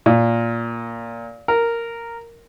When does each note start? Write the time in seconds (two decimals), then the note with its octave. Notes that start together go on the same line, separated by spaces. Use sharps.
0.06 A#2
1.48 A#4